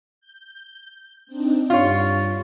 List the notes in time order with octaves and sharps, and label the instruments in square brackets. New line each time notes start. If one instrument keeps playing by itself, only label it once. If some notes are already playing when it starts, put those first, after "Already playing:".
[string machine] G6
C4 D4 D#4
[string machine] G2 G3 [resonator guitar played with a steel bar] F4 C#5